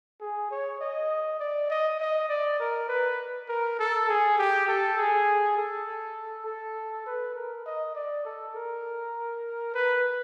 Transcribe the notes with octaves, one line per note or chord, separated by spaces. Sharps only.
G#4
C#5
D#5
D5
D#5
D#5
D5
A#4
B4
A#4
A4
G#4
G4
A4
G#4
A4
A4
B4
A#4
D#5
D5
A4
A#4
B4